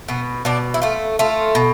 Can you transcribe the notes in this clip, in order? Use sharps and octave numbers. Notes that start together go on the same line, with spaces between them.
B2 B3
B2 D4
E4
A3 F4
A3 F4
B2